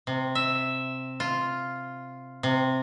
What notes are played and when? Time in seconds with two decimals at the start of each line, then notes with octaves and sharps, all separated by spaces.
0.07 C3
0.35 E5
1.20 F4
2.43 C3